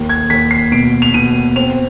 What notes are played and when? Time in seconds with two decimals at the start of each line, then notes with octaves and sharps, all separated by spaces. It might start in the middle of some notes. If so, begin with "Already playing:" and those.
Already playing: D#2
0.09 G#6
0.30 D#2 B6
0.51 C7
0.72 B2 D7
1.02 F7
1.14 B2 D#7
1.56 C4 F7